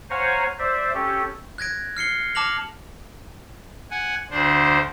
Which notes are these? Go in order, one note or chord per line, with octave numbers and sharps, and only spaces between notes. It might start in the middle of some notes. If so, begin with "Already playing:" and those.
C5 C#5 F5 F#5 G#5 A#5
C5 D5 E5
C#4 G4 A4
F#6 G#6 A#6 D7
F6 C7 C#7 G7
A5 D6 F6 A#6 F7 F#7
F#5 G#5
D2 D4 C5